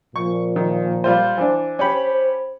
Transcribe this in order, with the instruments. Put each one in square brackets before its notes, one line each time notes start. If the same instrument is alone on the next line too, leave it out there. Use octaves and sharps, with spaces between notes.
[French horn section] A#2 F3 [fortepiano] C#6
[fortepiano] D#3
G3 F4 C5
[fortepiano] E3 D4 [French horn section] C5
[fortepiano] C#4 G4 B5